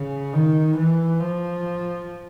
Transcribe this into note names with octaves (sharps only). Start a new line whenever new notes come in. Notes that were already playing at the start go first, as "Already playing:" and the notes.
Already playing: C#3
D#3
E3
F3